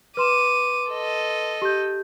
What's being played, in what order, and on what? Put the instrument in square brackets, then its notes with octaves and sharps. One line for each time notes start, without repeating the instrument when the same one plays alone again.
[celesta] B4 C6 E7 [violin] D6 D#7
[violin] A4 D#5
[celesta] G4 G6